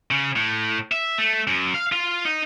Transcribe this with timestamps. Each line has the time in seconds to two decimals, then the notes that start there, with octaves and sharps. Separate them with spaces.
0.11 C#3
0.36 A2
0.92 E5
1.18 A3
1.47 F#2
1.74 F5
1.92 F4
2.25 D#4